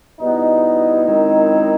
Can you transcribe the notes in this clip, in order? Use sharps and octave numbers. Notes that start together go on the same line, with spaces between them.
B2 G3 B3 D#4 E4
F#2 D#3 G#3 C4 E4